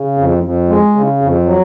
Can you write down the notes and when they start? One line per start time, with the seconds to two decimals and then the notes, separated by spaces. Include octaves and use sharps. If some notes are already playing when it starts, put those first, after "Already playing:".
Already playing: C#3
0.17 F2
0.44 F2
0.70 G#3
0.95 C#3
1.21 F2
1.46 F#3